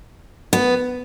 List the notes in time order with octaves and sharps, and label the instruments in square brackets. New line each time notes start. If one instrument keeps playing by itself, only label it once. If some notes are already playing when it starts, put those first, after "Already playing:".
[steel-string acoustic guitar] B3